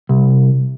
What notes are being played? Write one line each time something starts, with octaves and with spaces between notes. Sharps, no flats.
C2